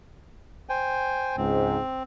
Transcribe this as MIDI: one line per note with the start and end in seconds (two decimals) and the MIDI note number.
0.69 1.36 72
0.69 1.36 79
0.69 1.36 80
1.37 1.77 37
1.37 1.77 44
1.37 2.03 60